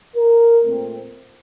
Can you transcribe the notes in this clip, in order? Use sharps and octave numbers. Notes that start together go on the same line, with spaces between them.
A#4
A#2 A3 C4